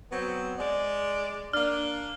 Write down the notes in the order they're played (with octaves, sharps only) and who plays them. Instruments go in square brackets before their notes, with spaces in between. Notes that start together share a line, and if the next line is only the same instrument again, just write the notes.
[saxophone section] F#3 B3 C4
G#3 D5
[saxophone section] A#3 D4 [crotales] F6